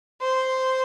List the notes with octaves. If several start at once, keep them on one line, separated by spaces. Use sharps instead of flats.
C5